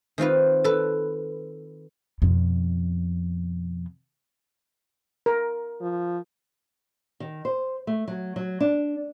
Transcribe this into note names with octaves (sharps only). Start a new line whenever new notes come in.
D#3 C4 F4 B4
A4 B4
F2 B2
A#4
F3
D#3
C5
A3
F#3
F#3
D4